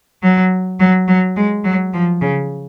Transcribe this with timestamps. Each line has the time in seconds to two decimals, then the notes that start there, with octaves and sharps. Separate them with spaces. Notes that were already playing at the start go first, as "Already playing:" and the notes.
0.23 F#3
0.80 F#3
1.08 F#3
1.36 G#3
1.64 F#3
1.93 F3
2.21 C#3